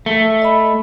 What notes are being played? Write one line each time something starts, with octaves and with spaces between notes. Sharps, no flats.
A3
D#5 B5